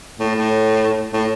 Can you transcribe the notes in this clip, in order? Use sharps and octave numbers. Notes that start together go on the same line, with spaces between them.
A2
A2
A2